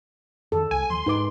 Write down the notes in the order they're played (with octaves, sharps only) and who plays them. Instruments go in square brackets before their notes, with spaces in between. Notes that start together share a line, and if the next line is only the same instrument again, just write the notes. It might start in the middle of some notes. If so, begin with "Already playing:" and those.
[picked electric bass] F2 D#3 [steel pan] A4
[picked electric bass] C2 [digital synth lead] G#5
[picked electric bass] D#2 F3 [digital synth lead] C6
[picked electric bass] G#2 [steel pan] D#4 B4 D6